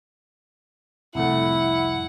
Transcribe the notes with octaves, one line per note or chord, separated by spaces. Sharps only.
C2 F2 A2 E4 F#5